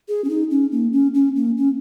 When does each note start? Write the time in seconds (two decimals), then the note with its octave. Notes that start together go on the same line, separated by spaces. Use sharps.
0.08 G#4
0.24 C#4
0.29 D#4
0.51 C#4
0.72 A#3
0.93 C#4
1.14 C#4
1.36 A#3
1.57 C#4